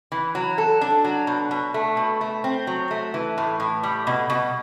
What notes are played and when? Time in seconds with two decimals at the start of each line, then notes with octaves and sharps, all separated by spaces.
0.12 E3
0.35 F#3
0.58 A4
0.81 D4
1.04 F#3
1.27 B2
1.51 B2
1.74 A3
1.97 B2
2.21 A3
2.44 C4
2.67 F#3
2.91 A3
3.14 E3
3.38 A2
3.60 A2
3.83 G3
4.07 B2
4.30 B2